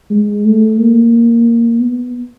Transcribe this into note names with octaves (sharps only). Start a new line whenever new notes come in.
G#3
A3
A#3
B3